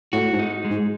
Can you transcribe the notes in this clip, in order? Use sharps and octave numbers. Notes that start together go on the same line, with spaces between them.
A2 F#4
G#2
D#4
G#3
G#2